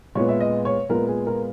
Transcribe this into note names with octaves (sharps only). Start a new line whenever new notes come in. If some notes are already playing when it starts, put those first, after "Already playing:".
A#2 G#3 B3 C#5
E5
D#5
C#5
A#2 G#3 B3 A#4
G#4
A#4